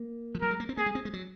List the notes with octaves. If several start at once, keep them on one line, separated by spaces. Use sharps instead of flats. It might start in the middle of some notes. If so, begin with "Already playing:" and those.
Already playing: A#3
F3
F#3 A#4
G#3
A#3
C4
A#3 G#4
G#3
C4
G#3
F#3